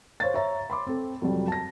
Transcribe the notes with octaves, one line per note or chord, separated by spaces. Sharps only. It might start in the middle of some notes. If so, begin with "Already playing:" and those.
C5 C#5 F5 A6
C#5 E5 A#5
B5 C6 D6
C4 A4
F2 C3 F#3 G3
A5 A#6